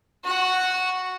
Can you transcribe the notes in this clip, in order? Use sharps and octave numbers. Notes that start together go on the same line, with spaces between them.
F#4 F#5